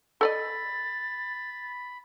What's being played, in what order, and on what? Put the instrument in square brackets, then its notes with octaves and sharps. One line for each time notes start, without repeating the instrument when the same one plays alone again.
[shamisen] A4 D5 D#5 [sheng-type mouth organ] B5 [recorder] A6